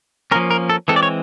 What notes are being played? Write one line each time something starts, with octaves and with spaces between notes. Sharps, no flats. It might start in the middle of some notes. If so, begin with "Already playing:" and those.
F3 A#3 C#4 A#4
A#4
A4
E3 G#3 C4 A4
D5
C#5